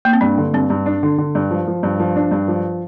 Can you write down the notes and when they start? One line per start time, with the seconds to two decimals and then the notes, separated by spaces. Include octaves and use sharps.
0.05 A#3
0.13 C4
0.21 G2 D4
0.38 D3
0.54 G2 C4
0.70 G2
0.86 D4
1.03 D3
1.18 D3
1.35 G2
1.51 F3
1.68 F3
1.83 G2
1.99 F3
2.16 D4
2.31 G2
2.48 F3